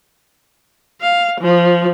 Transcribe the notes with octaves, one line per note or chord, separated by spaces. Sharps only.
F5
F3